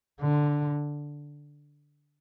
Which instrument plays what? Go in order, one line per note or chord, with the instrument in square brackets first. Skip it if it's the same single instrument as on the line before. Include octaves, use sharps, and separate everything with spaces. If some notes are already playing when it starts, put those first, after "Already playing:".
[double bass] D3